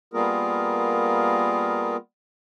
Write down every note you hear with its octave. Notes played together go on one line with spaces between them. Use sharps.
G3 A#3 B3 F4 G#4 A#4